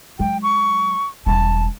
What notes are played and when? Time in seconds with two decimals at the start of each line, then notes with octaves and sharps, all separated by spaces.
0.19 F#3 G#3 G5
0.43 C#6
1.26 E1 G3 A5